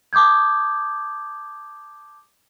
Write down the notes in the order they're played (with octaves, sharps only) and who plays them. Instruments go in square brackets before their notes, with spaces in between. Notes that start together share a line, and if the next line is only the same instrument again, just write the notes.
[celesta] A5 D6 D#6 G6 G#6